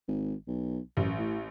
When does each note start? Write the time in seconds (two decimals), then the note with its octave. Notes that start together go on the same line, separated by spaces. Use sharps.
0.08 G#1
0.47 B1
0.97 A1 F#2
1.18 A2